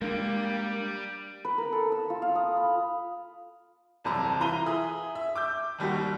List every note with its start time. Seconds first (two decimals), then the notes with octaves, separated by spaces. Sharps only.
0.02 G3 G#3 A#3 D4
1.45 B4
1.58 A#4
1.72 A4
1.92 E6
2.10 F4
2.22 F5
2.35 D#6
2.57 B5
4.04 E1 C2 F#2 C3 A5 A#5
4.40 E3 F4 A#5 D#7 G7
4.66 G#4 E5 D#6
5.15 E5
5.36 D6 E6 G6
5.79 G#1 D#2 G3 D#4 F#4